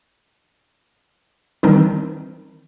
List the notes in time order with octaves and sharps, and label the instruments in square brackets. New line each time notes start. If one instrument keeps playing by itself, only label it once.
[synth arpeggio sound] D#3 E3 G3 C4 D4 D#4